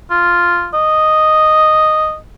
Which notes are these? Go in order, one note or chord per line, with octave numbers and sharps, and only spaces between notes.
F4
D#5